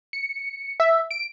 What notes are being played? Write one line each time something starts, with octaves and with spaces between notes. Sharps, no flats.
C#7
E5
D7